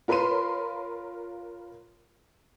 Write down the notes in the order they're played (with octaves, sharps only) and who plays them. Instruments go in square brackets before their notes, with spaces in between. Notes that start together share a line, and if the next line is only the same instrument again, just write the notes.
[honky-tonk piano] F4 A#4 B4 C#5 C6 D#7